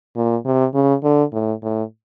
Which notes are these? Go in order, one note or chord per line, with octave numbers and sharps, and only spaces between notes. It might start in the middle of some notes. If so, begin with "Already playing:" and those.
A#2
C3
C#3
D3
A2
A2